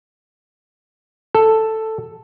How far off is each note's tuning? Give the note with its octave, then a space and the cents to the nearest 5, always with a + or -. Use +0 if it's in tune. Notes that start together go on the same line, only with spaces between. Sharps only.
A4 +5